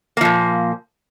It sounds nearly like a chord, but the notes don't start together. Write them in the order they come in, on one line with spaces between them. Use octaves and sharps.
A#3 F3 A#2